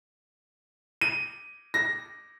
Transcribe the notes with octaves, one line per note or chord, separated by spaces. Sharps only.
D#7
A#6